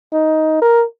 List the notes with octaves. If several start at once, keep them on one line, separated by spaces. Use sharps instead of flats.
D#4
A#4